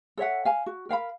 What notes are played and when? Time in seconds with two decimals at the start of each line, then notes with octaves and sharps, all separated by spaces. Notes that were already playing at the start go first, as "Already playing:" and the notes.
0.18 A4 C#5 E5 F#5
0.45 F5 G#5
0.66 F#4
0.89 A#4 F5 F#5 B5